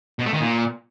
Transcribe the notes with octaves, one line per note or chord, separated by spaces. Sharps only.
B2
A3
D#3
A#2